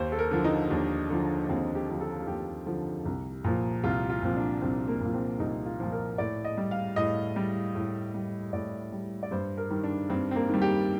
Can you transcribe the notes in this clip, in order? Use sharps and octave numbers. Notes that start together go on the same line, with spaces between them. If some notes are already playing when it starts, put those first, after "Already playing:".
Already playing: D#2 C5
A4
A#4
D3 F3
D#4
D#2 D4
D3 F3
D#2 C4
G4
D3 F3
A4
F4
D#2 G4
D3 F3
C2
A#2 F3
C2 F4
F4
A#2 F3 C4
D4
C2 C4
A#3
A#2 F3
C4
C2 D#4
F4
A#2 F3
A#4
A2 D5
D#5
G3
F5
A2 D#5
G3
A2
G3
A2 D5
G3
D5
G2 C5
A#4
D#3 G3
D4
G2 C4
C4
A#3
D#3 G3
G4